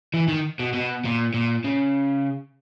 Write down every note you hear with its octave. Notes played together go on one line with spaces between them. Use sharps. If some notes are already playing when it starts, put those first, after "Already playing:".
E3
D#3
B2
B2
A#2
A#2
C#3